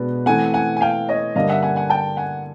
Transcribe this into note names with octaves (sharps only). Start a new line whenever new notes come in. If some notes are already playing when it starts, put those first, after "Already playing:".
Already playing: B2 G#3 B3 D4
E3 A3 C4 F#5 G#5
F#5 G#5
G#5
F5 G5
C#5 D#5
G2 D3 G3 A#3 D#5 F5
E5 F#5
F#5 G#5
F#5 G#5
G5 A5
F#5 G#5